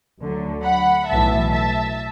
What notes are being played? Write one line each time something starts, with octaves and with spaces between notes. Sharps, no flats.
D2 D3 F#3
F#5 B5
B1 A2 E3 E5 A5
E5 A5